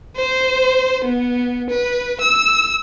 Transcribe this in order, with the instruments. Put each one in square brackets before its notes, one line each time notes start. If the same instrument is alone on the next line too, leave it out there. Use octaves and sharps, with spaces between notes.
[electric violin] C5
B3
B4
E6